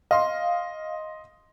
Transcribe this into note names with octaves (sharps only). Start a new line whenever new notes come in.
D#5 F5 C6